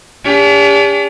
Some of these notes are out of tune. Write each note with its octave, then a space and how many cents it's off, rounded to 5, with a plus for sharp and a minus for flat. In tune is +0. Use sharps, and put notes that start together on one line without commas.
D4 -40 G4 +45